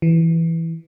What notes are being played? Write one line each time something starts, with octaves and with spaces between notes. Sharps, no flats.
E3